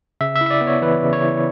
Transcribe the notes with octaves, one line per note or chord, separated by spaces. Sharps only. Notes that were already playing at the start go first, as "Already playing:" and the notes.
C#3 E5
E5
E4
E5
D5
B3
C#5
E3 B4
C#3
C#5
E4